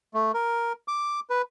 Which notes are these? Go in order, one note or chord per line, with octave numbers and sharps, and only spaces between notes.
A3
A#4
D6
B4